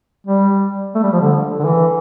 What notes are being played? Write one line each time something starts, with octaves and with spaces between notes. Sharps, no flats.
G3
A3
G3
F3
D3
D3
E3